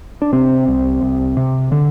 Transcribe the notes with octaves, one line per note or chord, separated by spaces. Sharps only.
D4
C3 C4
C2
C2
C3
D3